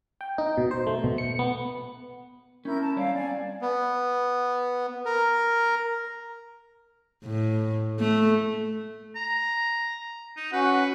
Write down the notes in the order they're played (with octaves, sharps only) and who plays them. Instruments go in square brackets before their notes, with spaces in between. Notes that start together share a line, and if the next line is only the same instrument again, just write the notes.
[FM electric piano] G5
D#4
B2
C5
A3
B2
C#7
B3
[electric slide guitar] C#4 [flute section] E4 A#4 G6
[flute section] A5 A#5
[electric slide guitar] G3 C#5 D5 [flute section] F5
[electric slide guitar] C4 [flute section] D5 G#5
[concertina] B3
A#4
[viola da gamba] A2
A3
[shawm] A#5
D#4
[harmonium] C#4 F#4 F#5 [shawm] B4